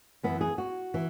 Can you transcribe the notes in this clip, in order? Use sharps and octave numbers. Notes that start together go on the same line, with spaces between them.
F#2 E3 B3
G#4
F#4
E3